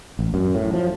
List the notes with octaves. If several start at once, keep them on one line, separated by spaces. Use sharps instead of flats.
A1
F#2
A2
F3